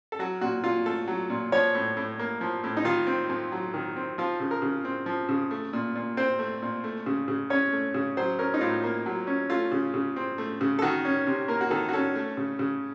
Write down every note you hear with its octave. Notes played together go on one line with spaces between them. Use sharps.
A4
F#3 F#4
A#2 F#4
A#2 F4
A3 A4
F#3
A#2
F3 C#5
A2
A2
A#3
F3
A2
D#4
D#3 F4
C4
F2
F#3
D#3
C4
F3 F4
C#3
A#4
C#3
C4
F3
C#3
A3
A#2
A#2
C4 C5
A3
A#2
A3
C#3
C#3
C#4 C#5
A3
C#3
F#3 C5
C#4 A#4
D#4
A2 F4
A#3
F#3
C#4
A3 F4
C#3
C#3
C4
A3
C#3
A4
D#3 F#4
C#4
C3
A#3 A#4
F#4
D#3 A4
F#4
C#4 A4
A3
C#3
C#3